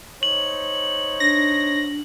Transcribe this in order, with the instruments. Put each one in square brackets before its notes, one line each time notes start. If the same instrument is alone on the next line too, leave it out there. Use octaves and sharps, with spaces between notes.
[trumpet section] D#4 C5 C#5 [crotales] F#7
[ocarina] D4 [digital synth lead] A#6